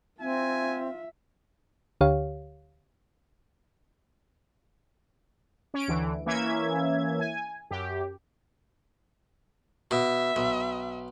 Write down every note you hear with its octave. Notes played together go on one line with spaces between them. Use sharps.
C4 F4 E5 G#5
D2 D3 G4 C#5 F5
C#4 D7
D2 D3 E3
E3 A#3 C#4 E5 G#6
G#5
F#2 G4
B2 E5
B1